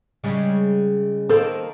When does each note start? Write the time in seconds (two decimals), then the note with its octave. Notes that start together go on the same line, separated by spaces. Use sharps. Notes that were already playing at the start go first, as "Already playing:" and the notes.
0.24 C#3 G3 G#3
1.29 D#3 A#3 A4 C5